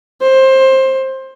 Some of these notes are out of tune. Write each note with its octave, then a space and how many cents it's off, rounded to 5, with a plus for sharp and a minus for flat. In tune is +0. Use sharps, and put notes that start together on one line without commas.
C5 +20